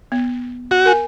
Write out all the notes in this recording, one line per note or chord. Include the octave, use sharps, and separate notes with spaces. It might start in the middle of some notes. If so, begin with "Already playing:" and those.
B3
F#4
A#4 G#5